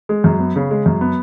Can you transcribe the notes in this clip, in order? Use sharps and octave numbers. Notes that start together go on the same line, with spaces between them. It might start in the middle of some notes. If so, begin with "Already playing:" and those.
G#3
F#2
B3
C#3
G#3
F#2
B3